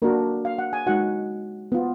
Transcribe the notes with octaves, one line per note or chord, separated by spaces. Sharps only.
A#3 D4 F#4 A#4
F5
F#5
G#5
G#3 D#4 F#4 F#5
B3 F4